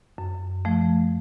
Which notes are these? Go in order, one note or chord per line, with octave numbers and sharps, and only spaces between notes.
F#2
F3 A3